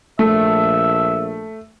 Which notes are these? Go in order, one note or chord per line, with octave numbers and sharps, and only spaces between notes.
A#1 A3 E5